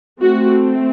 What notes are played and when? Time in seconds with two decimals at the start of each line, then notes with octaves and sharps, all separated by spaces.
0.20 A3 C4 F#4